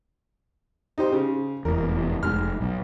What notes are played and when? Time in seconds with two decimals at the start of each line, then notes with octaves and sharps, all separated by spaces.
0.98 D#4 G4 C5
1.12 C#3
1.65 F1 E2 A#4
2.23 F1 G#2 F6
2.61 B1